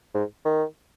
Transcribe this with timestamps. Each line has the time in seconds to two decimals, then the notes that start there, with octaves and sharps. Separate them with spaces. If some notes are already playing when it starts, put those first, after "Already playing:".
0.15 G#2
0.45 D#3